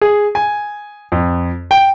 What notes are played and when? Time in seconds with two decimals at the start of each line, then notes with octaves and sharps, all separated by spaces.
0.02 G#4
0.35 G#5
1.12 F2
1.71 G5